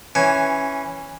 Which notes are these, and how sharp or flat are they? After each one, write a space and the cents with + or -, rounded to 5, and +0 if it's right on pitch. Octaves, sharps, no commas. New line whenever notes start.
E3 +0 C#4 +0